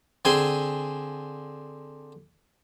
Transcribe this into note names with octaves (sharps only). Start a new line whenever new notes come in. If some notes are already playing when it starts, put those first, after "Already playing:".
D3 C4 G#4 G#5 C6